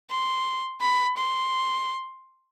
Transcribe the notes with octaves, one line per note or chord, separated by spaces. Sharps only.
C6
B5
C6